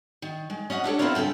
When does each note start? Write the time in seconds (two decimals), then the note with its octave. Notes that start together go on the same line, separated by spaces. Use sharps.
0.22 D#3
0.50 G#3
0.70 C#4 D#5 F5 F#5
0.84 D4 G4 A4 C#5
0.99 B3 C4 E4 F4 A#4 C#5
1.15 G2 C#3 A#3 A4 G5